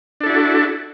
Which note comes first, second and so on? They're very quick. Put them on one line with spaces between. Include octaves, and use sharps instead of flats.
D4 A4 E4 F#4